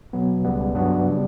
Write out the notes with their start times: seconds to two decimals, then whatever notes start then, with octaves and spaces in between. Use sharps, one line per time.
0.13 B2 F#3 B3
0.44 C#2 C#3 G3 B3
0.75 G2 F#3 B3 D4 F#4
1.08 C#3 G3